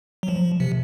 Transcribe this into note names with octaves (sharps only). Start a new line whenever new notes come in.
F#3
F3
C3